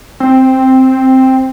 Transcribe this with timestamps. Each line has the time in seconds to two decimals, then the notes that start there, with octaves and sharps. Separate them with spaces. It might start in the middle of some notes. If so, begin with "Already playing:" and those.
0.20 C4